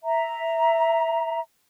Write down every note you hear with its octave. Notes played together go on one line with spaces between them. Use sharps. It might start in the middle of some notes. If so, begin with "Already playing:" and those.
E5 A#5